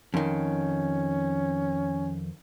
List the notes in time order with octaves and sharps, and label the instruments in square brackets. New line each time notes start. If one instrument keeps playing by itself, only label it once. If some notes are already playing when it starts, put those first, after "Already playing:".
[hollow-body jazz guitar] F2 D#3 [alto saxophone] C#4